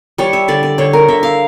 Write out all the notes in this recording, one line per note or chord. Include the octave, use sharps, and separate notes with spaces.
G3 C#5
E5
D3 D5
D5
D3 C#5
A#4
D3 E5
F5